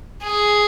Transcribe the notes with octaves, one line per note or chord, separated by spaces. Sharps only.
G#4